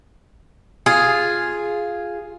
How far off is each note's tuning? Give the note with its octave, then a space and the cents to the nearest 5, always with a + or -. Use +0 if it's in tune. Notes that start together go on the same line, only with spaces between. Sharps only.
F4 +0 G#4 +0